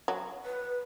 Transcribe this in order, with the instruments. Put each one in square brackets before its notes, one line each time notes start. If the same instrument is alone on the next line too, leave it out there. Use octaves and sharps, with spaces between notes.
[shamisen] F#3
[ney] B4